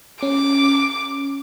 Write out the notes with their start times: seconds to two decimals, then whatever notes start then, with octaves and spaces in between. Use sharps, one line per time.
0.23 C#4 D6